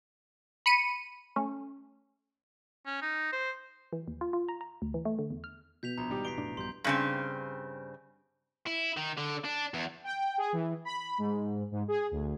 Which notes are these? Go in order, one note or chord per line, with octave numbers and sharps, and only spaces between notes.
B5 C#7 D#7
A3 C#4
C#4
D#4
C5
E3
D#2
F4
F4
A#5
A#5
D2
E3
A3
D3
E2
F6
B2 G6 B6 F7
A#1 A#5
G#1 G3 D#4 G4
E2 B6 C7 D7 G7
F1 A2 D4
A#1 G2 G3 C6 G6
G2 C#3 C4
E4
D#3
D3
D4
E2
G5
G#4
E3
B5
G#2
G#2
G#4
D2